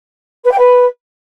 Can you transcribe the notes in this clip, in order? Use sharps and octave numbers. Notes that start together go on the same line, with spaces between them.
B4
G5
B4